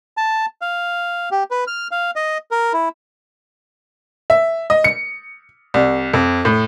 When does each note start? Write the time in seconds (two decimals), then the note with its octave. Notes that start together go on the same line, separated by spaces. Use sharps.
0.17 A5
0.62 F5
1.32 G4
1.51 B4
1.67 F6
1.91 F5
2.16 D#5
2.51 A#4
2.73 E4
4.30 E5
4.70 D#5
4.84 C#7
5.74 C2
6.13 F2
6.45 A2